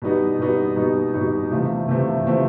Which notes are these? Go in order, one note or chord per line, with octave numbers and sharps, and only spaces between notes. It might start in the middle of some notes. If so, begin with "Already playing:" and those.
B2 G3 B3 D#4
B2 G3 B3 D#4
B2 G3 B3 D#4
B2 G3 B3 D#4
C3 E3 A3 C4 F4
C3 E3 A3 C4 F4
C3 E3 A3 C4 F4